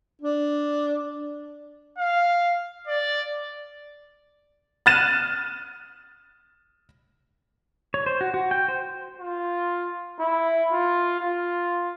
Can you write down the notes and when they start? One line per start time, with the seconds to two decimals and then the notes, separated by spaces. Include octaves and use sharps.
0.22 D4
1.98 F5
2.88 D5
4.86 F6 F#6 A6 D#7 E7
7.94 C#5
8.06 C5
8.21 F#4
8.34 F#4
8.51 G5
8.68 C5
9.19 F4
10.19 E4
10.72 F4
11.20 F4